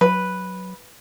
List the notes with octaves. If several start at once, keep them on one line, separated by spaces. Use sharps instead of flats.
F#3 B4